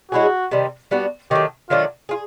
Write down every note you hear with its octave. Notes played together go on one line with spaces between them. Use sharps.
G#3 C#4 E4 F#4 G#4
C3 D#3 G3
G3 B3 D4 F#4
D#3 F#3 A3 G4
D#3 F#3 A3 D4 F4
F4 G#4